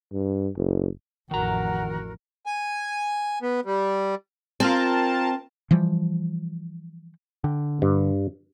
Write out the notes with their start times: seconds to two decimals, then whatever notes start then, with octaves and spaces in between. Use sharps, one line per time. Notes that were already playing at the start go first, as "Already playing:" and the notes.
0.12 G2
0.57 F#1
1.31 A1 F2 D#3 F#4 A#4 F#5 A#5
2.46 G#5
3.42 B3
3.65 G3
4.60 C4 F4 A#4 A5
5.71 E3 F3 G3
7.44 D3 G5
7.82 G2